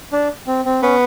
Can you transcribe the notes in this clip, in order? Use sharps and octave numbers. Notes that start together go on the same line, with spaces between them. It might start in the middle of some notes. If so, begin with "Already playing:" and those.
D4
C4
C4
B3 C#4